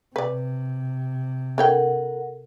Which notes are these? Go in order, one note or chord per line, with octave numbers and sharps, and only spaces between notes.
C3 B4 D5
D4 A4 A#4 C#5 F#5 G5